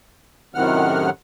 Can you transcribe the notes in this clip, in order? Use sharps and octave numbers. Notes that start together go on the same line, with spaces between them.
F#2 A2 C3 D#3 F#5 F6